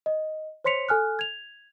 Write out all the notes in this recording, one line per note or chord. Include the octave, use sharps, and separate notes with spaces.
D#5
C5 C#5 C6 B6 C#7 F7
A4 G#5 F6 F#6
G#6 F7